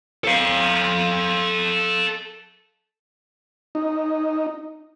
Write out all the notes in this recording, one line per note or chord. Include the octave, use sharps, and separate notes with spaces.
A4 F5
D#4